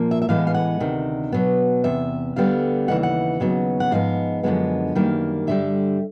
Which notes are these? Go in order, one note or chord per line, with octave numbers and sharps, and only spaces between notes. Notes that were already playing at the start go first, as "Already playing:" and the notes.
Already playing: A#2 F3 A#3
E5
E5
A2 E3 G#3 B3 F5
F5
F#5
D2 C3 D#3
B2 F#3 B3
E2 C3 E5
D2 D3 G3 B3 F5
D#2 C#3 E3 F#5
F#5
D#2 C#3 F#3 B3
F#5
G#2 F3 G#3 B3 F5
F#2 D3 F3 G#3 B3
F#2 D#3 G3 A#3
G2 D3 G3 E5